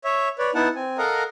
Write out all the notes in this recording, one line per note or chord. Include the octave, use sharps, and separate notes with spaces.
C#5 E5
B4 C#5 D5
B3 D#4 E4 F#5 A5
C4 G#5
A4 A#4 D#5 F5 F#5 A#5